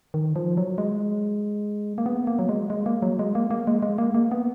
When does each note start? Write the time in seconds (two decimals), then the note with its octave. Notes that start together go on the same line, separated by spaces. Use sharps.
0.14 D#3
0.36 F3
0.57 F#3
0.78 G#3
1.98 A#3
2.06 B3
2.27 A#3
2.39 F#3
2.49 G#3
2.70 G#3
2.86 A#3
3.02 F#3
3.19 G#3
3.35 A#3
3.51 A#3
3.67 G#3
3.82 G#3
3.98 A#3
4.14 A#3
4.31 B3